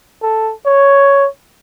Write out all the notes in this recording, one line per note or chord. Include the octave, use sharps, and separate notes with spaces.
A4
C#5